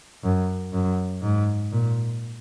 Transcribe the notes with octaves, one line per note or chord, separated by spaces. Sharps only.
F#2
F#2
G#2
A#2